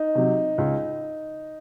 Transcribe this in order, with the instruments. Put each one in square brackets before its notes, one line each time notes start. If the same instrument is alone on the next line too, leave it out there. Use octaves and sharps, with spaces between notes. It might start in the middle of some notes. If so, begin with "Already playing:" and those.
Already playing: [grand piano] D#4
[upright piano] C3 F#3
C#2